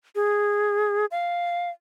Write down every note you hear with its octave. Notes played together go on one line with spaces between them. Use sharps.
G#4
F5